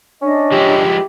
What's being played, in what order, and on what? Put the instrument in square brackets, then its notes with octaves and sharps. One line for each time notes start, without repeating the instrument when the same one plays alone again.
[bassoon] C#4 [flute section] D4 D#5
[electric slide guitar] F3 G#3 E4 [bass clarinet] G4